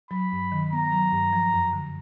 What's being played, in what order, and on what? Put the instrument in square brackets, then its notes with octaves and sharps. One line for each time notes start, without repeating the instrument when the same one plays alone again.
[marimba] F#3 [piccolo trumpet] B5
[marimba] G2
D#3
[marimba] B3 [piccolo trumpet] A#5
[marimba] F#3
G2
F3
F#2
D3